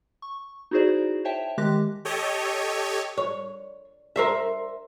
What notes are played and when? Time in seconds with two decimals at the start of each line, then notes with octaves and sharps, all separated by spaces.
0.22 C#6
0.71 D#4 E4 F#4 G#4 C5 D5
1.25 C5 C#5 E5 G5 A5
1.58 D#3 G#3 G4 D6 F#6 A#6
2.05 G4 A4 C#5 D#5
3.18 C#5
4.16 A#4 C5 E5